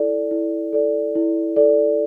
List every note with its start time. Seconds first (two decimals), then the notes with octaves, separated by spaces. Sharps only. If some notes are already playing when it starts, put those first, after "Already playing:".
Already playing: E4 A4 D5
0.31 E4
0.73 A4 D5
1.15 E4
1.56 A4 D5